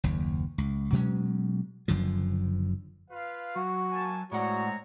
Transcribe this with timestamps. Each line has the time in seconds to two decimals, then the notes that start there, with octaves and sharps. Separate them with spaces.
0.04 F#1 D#2
0.58 C#2
0.92 B2 F#3 G#3 C#4
1.88 F#1 F#2 D3 F3
3.11 F4 B4 F5
3.56 F#3 F#4
3.91 A#3 G#5 A5
4.32 A2 G#3 C4 F#4 C#5 D5 F#5 A#5